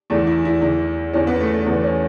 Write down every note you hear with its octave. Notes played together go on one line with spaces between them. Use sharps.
E2 E3 A3
E4
E4
E2 E3 E4
E2 E3 C#4
B3
A3
A3
E2 E3 B3
C#4